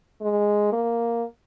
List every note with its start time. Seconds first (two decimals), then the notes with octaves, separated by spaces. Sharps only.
0.21 G#3
0.72 A#3